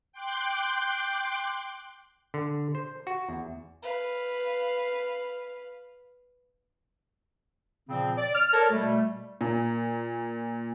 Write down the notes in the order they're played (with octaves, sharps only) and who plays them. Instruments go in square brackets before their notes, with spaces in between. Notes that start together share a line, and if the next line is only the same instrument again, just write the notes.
[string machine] G5 C6 D6 F#6 G6
[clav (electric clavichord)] D3
C5
F#4
E2
[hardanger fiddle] B4 F5
[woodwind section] A#2 C#3 F3 C4
D5
F6
A4 A#4 C#5 D5 A5
B2 G3 A3
[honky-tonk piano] A#2